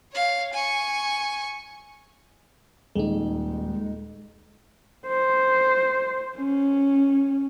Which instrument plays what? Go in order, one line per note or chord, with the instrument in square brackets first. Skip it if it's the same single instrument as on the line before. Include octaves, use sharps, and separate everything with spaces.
[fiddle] C#5 F5
G#5 C#6
[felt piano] D#1 [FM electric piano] G#3 D#4
[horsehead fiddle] C5
C#4